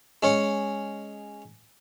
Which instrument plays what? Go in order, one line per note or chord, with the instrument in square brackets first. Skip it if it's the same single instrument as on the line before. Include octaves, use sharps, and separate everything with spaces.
[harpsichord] G#3 C#4 C#5